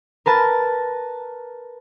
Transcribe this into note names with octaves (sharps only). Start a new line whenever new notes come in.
A#4 B4 A5